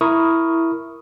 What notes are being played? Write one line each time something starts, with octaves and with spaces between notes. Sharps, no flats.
E4 A#4 C#6 D#6